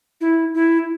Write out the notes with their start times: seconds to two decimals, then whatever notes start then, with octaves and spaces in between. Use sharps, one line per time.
0.21 E4
0.54 E4